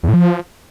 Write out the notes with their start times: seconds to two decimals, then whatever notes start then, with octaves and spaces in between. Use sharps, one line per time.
0.03 E2
0.08 A2
0.14 F3